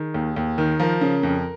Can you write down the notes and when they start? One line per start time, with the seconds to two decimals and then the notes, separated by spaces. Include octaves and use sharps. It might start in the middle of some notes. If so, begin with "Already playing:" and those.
Already playing: D#3 G#4
0.14 D#2
0.36 D#2
0.58 D#3
0.79 F3 A#4
1.01 C#3
1.23 F2